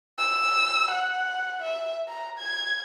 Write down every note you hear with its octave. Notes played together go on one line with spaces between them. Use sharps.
E6
F#5
E5
A#5
G#6